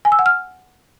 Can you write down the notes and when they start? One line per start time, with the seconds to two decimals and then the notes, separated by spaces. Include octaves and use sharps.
0.05 G#5
0.12 E6
0.19 F#5
0.26 F6